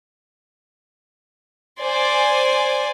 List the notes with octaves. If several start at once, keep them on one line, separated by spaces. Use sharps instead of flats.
C5 D5 G#5